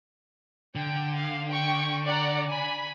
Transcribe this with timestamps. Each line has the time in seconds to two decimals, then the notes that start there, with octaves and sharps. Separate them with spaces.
0.75 D3 G5
1.15 F5
1.50 G5 C#6
2.06 D5 F#5 A#5
2.49 G#5 B5